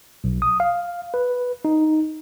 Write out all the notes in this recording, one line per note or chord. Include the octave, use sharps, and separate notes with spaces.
B1
D#6
F5
B4
D#4